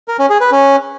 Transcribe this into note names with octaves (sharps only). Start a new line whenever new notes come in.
A#4
C#4
G#4
B4
C#4